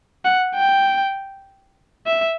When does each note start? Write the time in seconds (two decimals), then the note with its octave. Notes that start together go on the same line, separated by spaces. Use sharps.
0.25 F#5
0.55 G5
2.06 E5